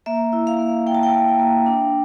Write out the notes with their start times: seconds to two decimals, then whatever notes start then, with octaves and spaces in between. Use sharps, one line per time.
0.06 A#3 E5
0.33 E4
0.47 F5
0.59 A#3
0.86 A#3 G5
0.95 A5
1.03 G5
1.13 A#3
1.39 A#3
1.66 D4